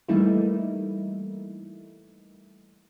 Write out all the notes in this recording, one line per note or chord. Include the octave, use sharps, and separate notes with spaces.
E3 G3 A3 A#3 D#4 E4